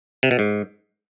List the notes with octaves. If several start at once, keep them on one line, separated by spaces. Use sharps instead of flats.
C3
B2
G#2